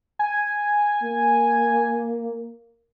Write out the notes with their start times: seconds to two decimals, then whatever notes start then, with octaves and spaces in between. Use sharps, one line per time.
0.19 G#5
1.03 A#3